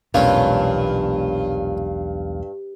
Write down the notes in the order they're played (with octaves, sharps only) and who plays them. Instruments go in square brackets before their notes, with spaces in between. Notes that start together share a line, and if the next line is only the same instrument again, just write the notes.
[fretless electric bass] E1 B1 E2 [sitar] G2 [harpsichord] A#2 G#3 C#4 [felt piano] F5